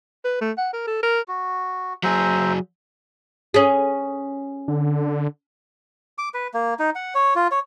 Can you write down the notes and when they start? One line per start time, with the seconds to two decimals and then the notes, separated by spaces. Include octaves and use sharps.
0.25 B4
0.41 A3
0.58 F#5
0.73 A#4
0.87 A4
1.03 A#4
1.28 F#4
2.03 F#3 G#4 C5 E5 A#5
3.54 C#4 G#4
4.68 D3
6.18 D6
6.34 B4
6.54 A#3
6.79 D#4
6.95 F#5
7.15 C#5
7.36 F4
7.51 C#5